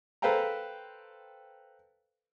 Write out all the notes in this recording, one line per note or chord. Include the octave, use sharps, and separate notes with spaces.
A4 B4 C5 F5 G5 A#5